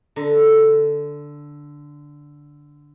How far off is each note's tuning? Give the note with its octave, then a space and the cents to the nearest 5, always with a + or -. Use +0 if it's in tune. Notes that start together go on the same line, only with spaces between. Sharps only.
D3 +0 A#5 +0